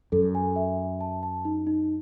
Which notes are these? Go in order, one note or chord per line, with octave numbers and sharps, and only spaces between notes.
F#2 A4
G#5
E5
E5
A5
A5
D#4
D#4